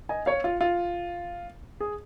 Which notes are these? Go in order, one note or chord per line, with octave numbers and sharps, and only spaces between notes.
D#5 G#5
C#5 F5
F4
F4
G#4